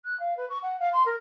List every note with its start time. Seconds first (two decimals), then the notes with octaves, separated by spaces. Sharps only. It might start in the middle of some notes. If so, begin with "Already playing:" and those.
0.04 F#6
0.19 F5
0.36 B4
0.49 C#6
0.62 F#5
0.79 F5
0.92 C6
1.05 A#4